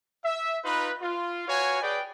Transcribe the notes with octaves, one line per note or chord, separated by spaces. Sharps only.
E5
D#4 F4 B4
F4
F#4 B4 C#5 F5 G#5
G#4 B4 D5 G5